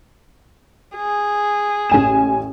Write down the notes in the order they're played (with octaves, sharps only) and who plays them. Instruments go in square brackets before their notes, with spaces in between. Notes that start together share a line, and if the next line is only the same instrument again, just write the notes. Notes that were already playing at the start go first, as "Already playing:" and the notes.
[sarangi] G#4
[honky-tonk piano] A1 G#5 E7